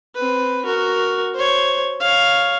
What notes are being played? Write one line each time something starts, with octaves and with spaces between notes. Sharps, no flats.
C4 B4
F#4 A#4
C5 C#5
C#5 F5